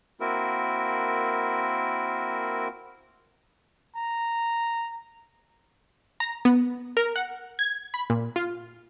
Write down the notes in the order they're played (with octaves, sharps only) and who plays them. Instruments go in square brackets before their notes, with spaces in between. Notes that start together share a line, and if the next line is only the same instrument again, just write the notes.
[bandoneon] A#3 C4 E4 F#4 A#4
[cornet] A#5
[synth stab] A#5
B3
A#4
F#5
G#6
B5
A#2
F4